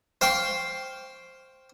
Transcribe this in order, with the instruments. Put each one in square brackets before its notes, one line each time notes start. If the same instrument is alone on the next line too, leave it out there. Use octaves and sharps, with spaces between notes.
[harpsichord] C5 F5 G5 C6 C#6